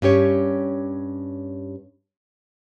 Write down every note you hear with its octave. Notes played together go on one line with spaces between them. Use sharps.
G2 C#4 G4 C#5